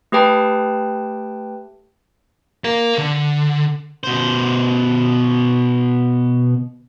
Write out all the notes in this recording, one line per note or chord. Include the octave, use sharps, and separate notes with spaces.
A3 G4 B4 G5 A5
A#4 F5
D3
B2 C5